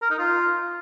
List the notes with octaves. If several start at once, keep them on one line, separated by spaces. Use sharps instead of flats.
A#4
D#4
F4